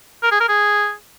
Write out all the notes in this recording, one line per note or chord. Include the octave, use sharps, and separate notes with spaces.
A#4
G#4
A#4
G#4